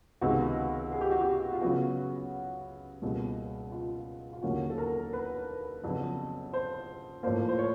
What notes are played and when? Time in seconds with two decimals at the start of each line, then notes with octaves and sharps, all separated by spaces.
0.21 C#2 C3 D#3 G#3 B3 F#4
0.92 G#4
1.01 G4
1.11 F#4
1.21 G4
1.53 F4
1.61 C#3 F#3 B3 F#4
3.02 C#2 B2 G3 A#3
3.72 F4
4.33 F4
4.43 D#2 D3 F#3 A#3 C#4 F#4
4.70 A4
4.78 A#4
5.13 B4
5.83 F2 C#3 F#3 B3 D4
6.53 C5
7.23 A2 F3 A#3 C5
7.49 C5
7.58 C#5